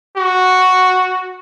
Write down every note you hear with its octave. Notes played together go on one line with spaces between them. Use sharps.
F#4